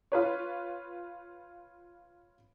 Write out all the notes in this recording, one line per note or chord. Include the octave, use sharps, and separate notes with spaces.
F4 B4 C#5